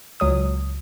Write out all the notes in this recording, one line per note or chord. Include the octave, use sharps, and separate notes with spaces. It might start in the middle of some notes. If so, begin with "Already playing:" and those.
C#2 F#3 D#6